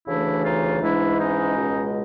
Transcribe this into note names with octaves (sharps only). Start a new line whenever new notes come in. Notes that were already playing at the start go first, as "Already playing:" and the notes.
D2 C#3 E3 A3 D4 E4
D#4 F4
G#2 E3 G#3 D4 E4
C#4 D#4
C#2 B2 G#3